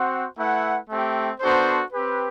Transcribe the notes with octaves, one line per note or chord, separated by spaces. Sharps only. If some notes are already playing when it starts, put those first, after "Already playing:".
Already playing: C4 F#4 C5 F#5
A3 E4 B4 F#5
A3 C4 G4
B3 D4 F#4 A4 C5
C4 G4 B4